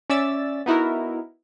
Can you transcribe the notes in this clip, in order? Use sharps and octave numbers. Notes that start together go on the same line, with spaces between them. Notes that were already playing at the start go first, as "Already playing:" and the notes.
C#4 D5 E5 E6 A6
B3 D#4 E4 F#4 A#4